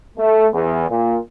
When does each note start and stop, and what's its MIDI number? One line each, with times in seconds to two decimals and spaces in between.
0.18 0.47 57
0.53 0.86 40
0.90 1.17 46